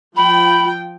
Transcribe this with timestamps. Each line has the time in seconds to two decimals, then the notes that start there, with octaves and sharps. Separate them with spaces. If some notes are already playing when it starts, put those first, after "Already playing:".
0.16 F3 F4 G5 B5